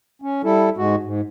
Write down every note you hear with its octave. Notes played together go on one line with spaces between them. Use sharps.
C#4
G3 E4 A4
G#2 G#3 F#4
G#2